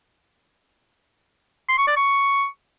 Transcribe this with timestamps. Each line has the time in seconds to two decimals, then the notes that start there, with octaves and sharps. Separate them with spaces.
1.69 C6
1.78 C#6
1.87 D5
1.97 C#6